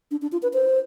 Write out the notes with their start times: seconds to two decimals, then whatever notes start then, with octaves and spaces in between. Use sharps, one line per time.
0.11 D4
0.22 D4
0.32 F4
0.42 B4
0.53 C5